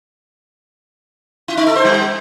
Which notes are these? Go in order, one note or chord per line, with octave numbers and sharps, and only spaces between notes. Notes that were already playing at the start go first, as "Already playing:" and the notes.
E4
D#4
A4
C5
G3